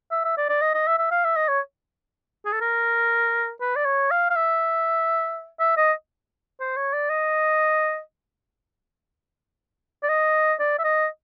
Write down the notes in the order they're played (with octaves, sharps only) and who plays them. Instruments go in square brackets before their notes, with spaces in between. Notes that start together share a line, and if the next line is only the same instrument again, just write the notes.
[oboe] E5
E5
D5
D5
D#5
D#5
E5
E5
F5
E5
D#5
C#5
G#4
A4
A#4
B4
D5
C#5
F5
F5
E5
E5
D#5
C5
C#5
D5
D#5
D5
D#5
D5
E5
D#5